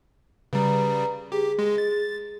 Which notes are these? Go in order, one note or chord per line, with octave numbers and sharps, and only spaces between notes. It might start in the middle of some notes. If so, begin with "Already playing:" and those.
C#3 G3 B4 A#5
G4 G#4
G#3
A6